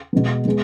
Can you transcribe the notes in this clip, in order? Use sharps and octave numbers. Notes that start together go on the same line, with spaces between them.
B2 G#3 B3
G#3 B3